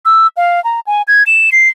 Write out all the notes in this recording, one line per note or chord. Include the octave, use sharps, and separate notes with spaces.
E6
F5
A#5
G#5
G#6
E7
C7